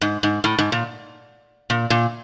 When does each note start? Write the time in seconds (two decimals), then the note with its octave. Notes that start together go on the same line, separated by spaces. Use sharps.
0.01 G#2
0.23 G#2
0.44 A2
0.58 G#2
0.72 A#2
1.70 A#2
1.90 A#2